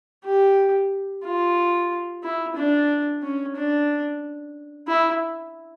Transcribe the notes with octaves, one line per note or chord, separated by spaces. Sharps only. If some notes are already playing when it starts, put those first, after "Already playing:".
G4
F4
E4
D4
C#4
D4
E4